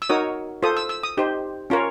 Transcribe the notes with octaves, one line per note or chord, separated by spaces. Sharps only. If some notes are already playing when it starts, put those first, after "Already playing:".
E6
D#4 F#4 A#4 C#5 D#6
F4 A4 C5 D#6
E6
E6
D#6
D#4 G4 C5
C#4 F4 A#4 C#5